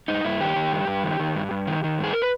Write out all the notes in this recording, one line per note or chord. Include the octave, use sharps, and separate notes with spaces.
G2 D#4
G2 E4
D#3 G4
D#3
G2
G2
D#3
D#3
G2
G2
D#3
D#3
G2 G#4
A#4
B4